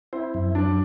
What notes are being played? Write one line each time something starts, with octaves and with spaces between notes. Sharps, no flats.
C4 E4 C5
F#2
F#3 D4 D5